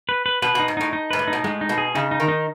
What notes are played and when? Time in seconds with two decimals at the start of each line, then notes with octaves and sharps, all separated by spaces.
0.09 B4
0.26 B4
0.42 B2 B4
0.55 B2 D#4
0.68 G#2
0.77 A2 D#4
0.93 D#4
1.11 G#2 B4
1.19 A2
1.28 D#4
1.33 B2
1.44 A2 G#3
1.61 D#4
1.69 B2
1.78 G#4
1.95 C#3 D#4
2.11 D#4
2.20 D#3
2.28 D#4